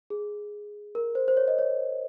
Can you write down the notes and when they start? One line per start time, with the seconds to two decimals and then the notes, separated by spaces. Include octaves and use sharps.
0.10 G#4
0.95 A#4
1.15 C5
1.28 C5
1.37 C#5
1.48 D#5
1.59 C#5